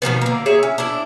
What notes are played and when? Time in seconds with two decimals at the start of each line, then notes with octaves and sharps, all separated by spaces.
0.02 B2 D#3 F3 B3
0.21 D3 A#3
0.46 G#4 C#5 E5
0.63 C#4
0.78 D4 E4